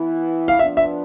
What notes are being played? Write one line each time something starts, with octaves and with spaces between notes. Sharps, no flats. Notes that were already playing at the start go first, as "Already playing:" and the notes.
Already playing: E3 B3 E4
F5
F3 B3 D4 E5
E5